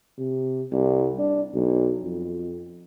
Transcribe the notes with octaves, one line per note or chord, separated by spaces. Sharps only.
C3
C2
D4
B1
F2